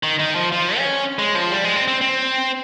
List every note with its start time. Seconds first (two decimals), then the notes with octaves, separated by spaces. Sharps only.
0.03 D#3
0.19 D#3
0.35 F3
0.52 F3
0.77 C#4
1.19 G#3
1.35 F3
1.51 G3
1.64 G#3
1.76 C4
1.88 C4
2.01 C4